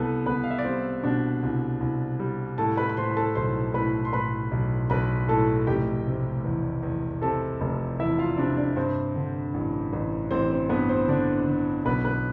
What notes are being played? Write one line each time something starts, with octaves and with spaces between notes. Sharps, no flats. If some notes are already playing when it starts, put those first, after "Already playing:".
Already playing: C2 G3 B3 A4 B4
C2 B3 B4
F5
E5
D5
G3 C4 C5
B2 D4 D5
C2
C2
G3
A2 A4 A5
B4 B5
B5
A2 C5 C6
B5
A4 A5
B1 C5 C6
A2 B4 B5
C6
A2 B4 B5
B1
B1 B4 B5
A2 A4 A5
F1 G4 G5
C3
E2
E2
C3 A4 A5
F1
E2 E4 E5
F4 F5
C3 D4 D5
D4 D5
G2 C4 C5
D3
A1
A1
A1 C4 C5
C4 C5
G2 B3 B4
C4 C5
D3 D4 D5
D3
B1 B3 B4
B3 B4